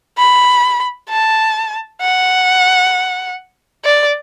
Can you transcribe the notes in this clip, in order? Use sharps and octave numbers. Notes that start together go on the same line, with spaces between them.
B5
A5
F#5
D5